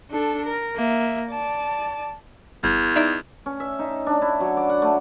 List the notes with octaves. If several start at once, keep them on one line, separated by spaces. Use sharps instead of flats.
D4 A4
A#4
A#3 E5
D5 A5
G1 E2
D#4 D5 E5
C#4
E5
D#4
D4
E4
F#3
D5
F#5
A3